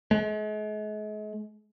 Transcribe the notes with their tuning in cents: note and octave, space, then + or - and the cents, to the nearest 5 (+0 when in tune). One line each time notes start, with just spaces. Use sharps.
G#3 +40